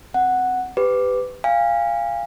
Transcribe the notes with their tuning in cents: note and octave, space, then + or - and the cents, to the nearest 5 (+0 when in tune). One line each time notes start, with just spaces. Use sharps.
C4 +0 F#5 +0
G4 +10 B4 +20 D6 +0
F5 -10 G#5 -35